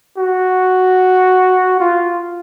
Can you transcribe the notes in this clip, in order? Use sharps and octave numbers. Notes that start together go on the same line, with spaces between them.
F#4
F4